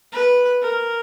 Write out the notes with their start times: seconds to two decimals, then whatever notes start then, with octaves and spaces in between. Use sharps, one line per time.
0.12 B4
0.62 A#4